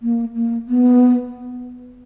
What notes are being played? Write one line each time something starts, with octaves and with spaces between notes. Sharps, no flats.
A#3
A#3
B3